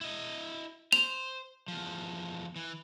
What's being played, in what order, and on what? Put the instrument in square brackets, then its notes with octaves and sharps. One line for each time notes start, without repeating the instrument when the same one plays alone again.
[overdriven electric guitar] E4 D#5
[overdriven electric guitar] C5 [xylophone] F7
[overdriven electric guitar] E2 F3
E3